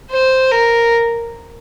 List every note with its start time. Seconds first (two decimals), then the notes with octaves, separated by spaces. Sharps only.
0.11 C5
0.52 A#4